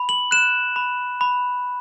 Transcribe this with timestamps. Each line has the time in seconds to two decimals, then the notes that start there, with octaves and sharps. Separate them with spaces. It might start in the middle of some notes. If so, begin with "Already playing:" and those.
Already playing: B5
0.09 F#7
0.31 F#6 E7
0.76 B5
1.21 B5